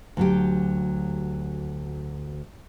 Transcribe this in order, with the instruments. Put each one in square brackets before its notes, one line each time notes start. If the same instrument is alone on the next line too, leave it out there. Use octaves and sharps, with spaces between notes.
[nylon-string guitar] D2 F#3 G4